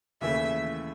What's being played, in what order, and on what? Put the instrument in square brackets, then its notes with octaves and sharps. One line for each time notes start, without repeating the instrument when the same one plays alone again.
[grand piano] D#2 C#3 E3 A3 E4 [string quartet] E5